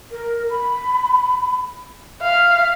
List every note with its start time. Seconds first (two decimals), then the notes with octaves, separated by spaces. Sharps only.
0.11 A#4
0.50 B5
2.22 E5 F5